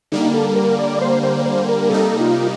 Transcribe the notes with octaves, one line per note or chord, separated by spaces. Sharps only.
D3 G3 A#3 D#4
A4
A#4
D5
C5
C5
C5
A#4
C3 G3 A#3 D#4 A4
F4